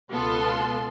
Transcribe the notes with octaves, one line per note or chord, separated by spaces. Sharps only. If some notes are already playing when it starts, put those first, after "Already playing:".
C#2 B2 B3 F4 A4 C6